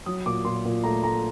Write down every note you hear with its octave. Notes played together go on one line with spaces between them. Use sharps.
F#3 D#6
A#2 D6
A#2 C6
A#2
A3 A#5
A3 A#5